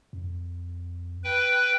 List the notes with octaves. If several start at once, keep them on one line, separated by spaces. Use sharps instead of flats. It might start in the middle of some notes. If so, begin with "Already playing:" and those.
F2
B4 G5